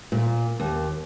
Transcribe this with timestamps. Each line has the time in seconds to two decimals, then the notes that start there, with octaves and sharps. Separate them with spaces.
0.12 A#2
0.60 D#2